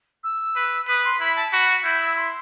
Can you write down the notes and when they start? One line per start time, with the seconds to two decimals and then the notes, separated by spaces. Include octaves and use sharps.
0.24 E6
0.56 B4
0.87 B4 D#6
1.04 C6
1.20 E4 B5
1.36 A5
1.52 F#4 B5
1.84 E4 G6
2.01 E6
2.16 C6